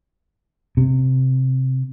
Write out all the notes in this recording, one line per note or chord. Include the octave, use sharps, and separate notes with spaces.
C3